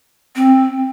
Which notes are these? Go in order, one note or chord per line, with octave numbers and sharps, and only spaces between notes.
C4